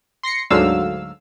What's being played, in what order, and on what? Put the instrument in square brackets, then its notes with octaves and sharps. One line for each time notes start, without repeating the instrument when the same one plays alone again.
[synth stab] C6 A#6 C7 C#7
D2 G#2 D3 F#3 F5 E6